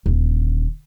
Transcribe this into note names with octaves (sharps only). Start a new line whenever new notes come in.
D#1 D3